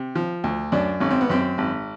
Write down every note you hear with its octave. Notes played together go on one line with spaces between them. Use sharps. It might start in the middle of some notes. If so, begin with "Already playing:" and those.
Already playing: C3
F3
D2
F#2 D4
G#1 C#4
C4
B3
F#2 C4
G#1